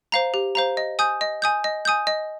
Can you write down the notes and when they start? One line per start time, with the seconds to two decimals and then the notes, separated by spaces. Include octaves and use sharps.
0.12 C5 F5 A#5
0.34 G4
0.55 C5 F5 A#5
0.77 D#5
0.99 G#5 D#6 G6
1.21 D#5
1.42 G#5 D#6 G6
1.64 D#5
1.85 G#5 D#6 G6
2.07 D#5